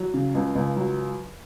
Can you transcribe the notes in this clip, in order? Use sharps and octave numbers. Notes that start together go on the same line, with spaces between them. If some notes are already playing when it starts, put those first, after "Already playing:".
Already playing: F#3
C#3
C#2
C#2
F#3